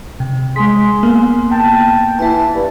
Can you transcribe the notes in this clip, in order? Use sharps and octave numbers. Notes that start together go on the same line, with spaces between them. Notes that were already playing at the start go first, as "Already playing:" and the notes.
C3
G#3 G#4 C6 B6
A#3 B3
G5 A5
E3 E4 A5
G2